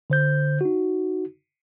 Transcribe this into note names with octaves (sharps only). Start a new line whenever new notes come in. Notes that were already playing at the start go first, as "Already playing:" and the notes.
D3 C5 G6
D#4 F#4